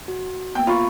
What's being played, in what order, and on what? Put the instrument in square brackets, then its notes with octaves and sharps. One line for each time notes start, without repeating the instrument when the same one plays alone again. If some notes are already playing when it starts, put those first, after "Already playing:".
[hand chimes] F#4
[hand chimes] A#3 B3 [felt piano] G5
[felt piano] F4 [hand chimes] A#5 B5 C#6